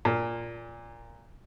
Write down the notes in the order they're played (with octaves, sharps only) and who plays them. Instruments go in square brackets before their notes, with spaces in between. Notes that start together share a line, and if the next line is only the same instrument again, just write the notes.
[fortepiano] A#2